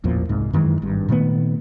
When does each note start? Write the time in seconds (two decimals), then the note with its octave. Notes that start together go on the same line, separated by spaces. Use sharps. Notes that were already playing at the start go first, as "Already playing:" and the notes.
0.04 A1 E2 A#2 F3
0.29 C2 G#2
0.53 F#2 D#3 E3 G#3
0.82 G#1 G2
1.09 A#2 D#3 A3 B3